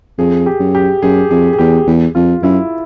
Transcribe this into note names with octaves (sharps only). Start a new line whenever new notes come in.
F2 G#4
G4
F#2
G4
F#2 G#4
F2 G#4
G#4
E2 G4
E2
F2 F4
F#2 E4